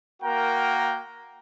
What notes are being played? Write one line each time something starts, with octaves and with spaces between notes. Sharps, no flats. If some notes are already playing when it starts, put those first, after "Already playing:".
A#3 F#4 A#4 G5 A#5